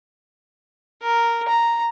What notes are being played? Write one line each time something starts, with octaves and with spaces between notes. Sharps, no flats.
A#4
A#5